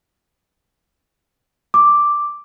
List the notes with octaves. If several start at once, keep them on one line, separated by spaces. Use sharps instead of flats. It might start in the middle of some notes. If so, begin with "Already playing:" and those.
D6